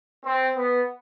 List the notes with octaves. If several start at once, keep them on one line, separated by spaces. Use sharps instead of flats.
C4
B3